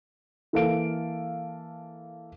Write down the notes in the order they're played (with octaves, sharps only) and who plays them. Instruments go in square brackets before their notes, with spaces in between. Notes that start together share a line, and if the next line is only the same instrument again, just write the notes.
[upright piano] E3 A#3 A4 F5 D7